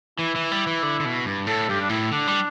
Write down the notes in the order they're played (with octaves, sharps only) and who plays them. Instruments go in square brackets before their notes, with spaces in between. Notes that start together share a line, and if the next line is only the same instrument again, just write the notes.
[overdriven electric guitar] E3 [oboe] E4
[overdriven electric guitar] E3
G3
E3
D3
D3
B2
G2
[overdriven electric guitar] A2 [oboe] A4
[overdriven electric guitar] G2 [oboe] G4
[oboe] D4
[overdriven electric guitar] A2 [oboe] E4
[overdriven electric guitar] D3 [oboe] D4
[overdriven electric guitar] G3